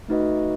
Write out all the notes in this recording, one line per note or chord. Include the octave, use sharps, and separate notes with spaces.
A3 D#4 F#4 B4 D#5